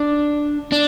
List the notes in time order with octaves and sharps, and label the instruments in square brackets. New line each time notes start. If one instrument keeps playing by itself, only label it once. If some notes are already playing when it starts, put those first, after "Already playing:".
Already playing: [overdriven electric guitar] D4
D4